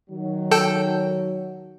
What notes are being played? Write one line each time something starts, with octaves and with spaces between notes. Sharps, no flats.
D#3 F#3
A4 G5